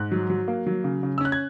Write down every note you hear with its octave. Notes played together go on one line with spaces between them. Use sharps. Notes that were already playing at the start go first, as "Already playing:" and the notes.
Already playing: G#2 F#6
F#3
F#3
A#3
F#3
C#3
C#3
E6
C#4 F#6
G#6